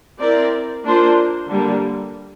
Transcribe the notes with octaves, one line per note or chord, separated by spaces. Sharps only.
C4 E4 A#4 D5
A#3 D4 F4 C5
D3 G3 A#3